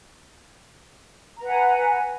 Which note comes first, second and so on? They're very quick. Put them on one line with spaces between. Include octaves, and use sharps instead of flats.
A#5 B4 F#5 G#5